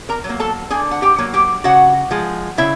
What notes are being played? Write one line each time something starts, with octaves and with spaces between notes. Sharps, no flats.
A#4 A#5
F#3
A#3
A4 A5
D3 G#4 G#5
F#5
G4 G5
F#3 A#3
G4 G5
C#3 F#4 F#5
F3 G#3
C#3 E4 E5